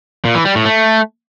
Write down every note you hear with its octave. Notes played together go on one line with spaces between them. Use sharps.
A#2
E3
G3
A2
A3